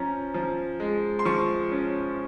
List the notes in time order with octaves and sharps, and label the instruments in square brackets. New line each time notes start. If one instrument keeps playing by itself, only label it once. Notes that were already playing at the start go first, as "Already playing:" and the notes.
Already playing: [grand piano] F3 C#4 A#5
F3
G#3
C6
F3 C#6
C#4